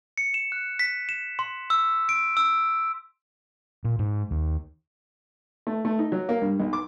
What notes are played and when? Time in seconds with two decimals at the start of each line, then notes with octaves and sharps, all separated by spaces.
0.18 C#7
0.34 E7
0.52 F#6
0.79 B6
1.09 E7
1.39 C6
1.70 E6
2.09 D7
2.37 E6
3.84 A#2
3.99 G#2
4.31 D#2
5.67 A3
5.85 A3
5.99 D#4
6.12 F#3
6.29 A#3
6.42 G2
6.60 B1
6.73 D6